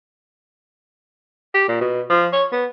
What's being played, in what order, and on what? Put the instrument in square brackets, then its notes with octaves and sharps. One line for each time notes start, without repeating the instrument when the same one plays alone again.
[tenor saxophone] G4
A#2
B2
F3
C#5
B3